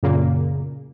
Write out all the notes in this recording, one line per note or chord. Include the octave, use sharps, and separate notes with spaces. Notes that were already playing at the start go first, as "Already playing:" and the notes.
F#2 A#2 C#3 A#3